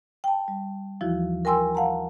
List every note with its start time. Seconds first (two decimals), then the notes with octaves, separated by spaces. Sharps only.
0.24 G5 A5
0.48 G3
1.01 D#2 E3 F3 E4 F#4
1.45 A#4 G5 G#5 C6 E6
1.75 F5 F#5 A5 A#5